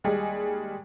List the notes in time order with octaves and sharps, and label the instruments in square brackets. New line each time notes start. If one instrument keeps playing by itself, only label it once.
[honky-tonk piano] D#2 G3 G#3 G#4